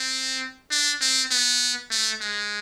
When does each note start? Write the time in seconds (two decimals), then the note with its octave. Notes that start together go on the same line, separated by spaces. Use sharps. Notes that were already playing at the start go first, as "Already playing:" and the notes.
Already playing: C4
0.71 D4
1.01 C4
1.31 B3
1.91 A3
2.21 G#3